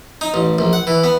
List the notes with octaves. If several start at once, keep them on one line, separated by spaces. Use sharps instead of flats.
D#4
A1
A#1
F#5
E3
B3